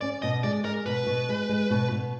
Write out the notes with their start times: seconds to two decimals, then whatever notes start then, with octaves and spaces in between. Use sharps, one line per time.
0.01 C#4 D5
0.22 B2 D#5
0.43 G#3 D5
0.65 G#3 A#4
0.86 B2 B4
1.07 B2
1.29 G#3
1.49 G#3
1.71 B2
1.92 B2